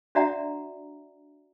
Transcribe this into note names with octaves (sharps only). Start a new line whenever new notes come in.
D4 F#4 D5 E5 F#5 A#5